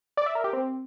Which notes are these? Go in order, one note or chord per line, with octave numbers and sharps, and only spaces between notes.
D5
E5
A#4
G4
C4